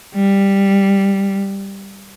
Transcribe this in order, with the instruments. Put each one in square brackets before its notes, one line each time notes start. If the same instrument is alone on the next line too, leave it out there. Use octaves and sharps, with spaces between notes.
[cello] G3